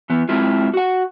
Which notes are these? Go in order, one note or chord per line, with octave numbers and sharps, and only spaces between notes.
E3 B3
G#3 C4 E4 F4
F#4 F#5